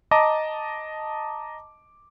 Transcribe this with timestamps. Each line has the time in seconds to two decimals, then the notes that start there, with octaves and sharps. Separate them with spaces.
0.11 D#5 A5 A#5 D6